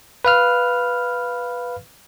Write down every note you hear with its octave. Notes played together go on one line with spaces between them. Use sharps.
B4 F5 F6